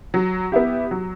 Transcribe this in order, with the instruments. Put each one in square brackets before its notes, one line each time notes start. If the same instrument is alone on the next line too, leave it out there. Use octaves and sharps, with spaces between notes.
[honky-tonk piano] F#3
B3 E4 G4
F#3